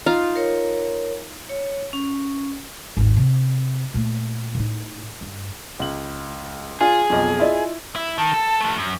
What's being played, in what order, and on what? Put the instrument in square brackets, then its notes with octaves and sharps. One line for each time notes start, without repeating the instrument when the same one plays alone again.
[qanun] D#4 F4 F5
[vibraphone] A#4 C#5
C#5
C#4
[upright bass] G#1 D#2
C3
A#2 A3
A2 D#4
G2
[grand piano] C#2 F#7
[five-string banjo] D4 G#5 [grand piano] F4 [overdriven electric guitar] G#4
[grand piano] B1 F2 [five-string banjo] F4 D#5
[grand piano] E4 [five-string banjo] F4 D5 D#5
[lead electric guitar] E4
[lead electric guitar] D#3 [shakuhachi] A5
[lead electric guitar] A4
F3 A3
F#2